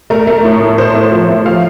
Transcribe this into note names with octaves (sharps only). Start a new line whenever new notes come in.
A3 A#4
A3
A2
A2
A2 C5
A3
F3
A3
F3 F5